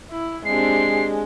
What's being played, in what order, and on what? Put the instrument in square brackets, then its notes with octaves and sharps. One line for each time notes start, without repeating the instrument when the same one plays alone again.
[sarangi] E4
[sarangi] G#3 [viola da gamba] C4 D4 G4 [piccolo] C7